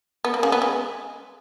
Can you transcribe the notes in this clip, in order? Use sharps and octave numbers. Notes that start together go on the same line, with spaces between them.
B3
A#3
C#3
B3
G#3